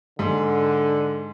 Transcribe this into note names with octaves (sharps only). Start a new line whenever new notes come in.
G#2 D3